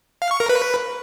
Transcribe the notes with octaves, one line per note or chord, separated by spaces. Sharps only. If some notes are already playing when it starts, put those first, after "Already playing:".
F5
C#6
A#4
B4